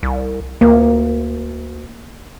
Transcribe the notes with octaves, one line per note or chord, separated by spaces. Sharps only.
C2
D2 A#3